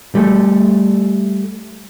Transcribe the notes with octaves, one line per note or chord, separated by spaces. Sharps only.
G3 A3